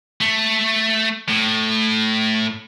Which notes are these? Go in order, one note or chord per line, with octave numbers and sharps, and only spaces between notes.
A3
A2